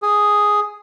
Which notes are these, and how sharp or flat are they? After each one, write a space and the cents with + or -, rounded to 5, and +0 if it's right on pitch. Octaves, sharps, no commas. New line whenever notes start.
G#4 +0